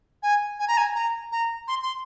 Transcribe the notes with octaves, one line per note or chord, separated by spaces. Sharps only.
G#5
G#5
A#5
G#5
A#5
A#5
C6
C6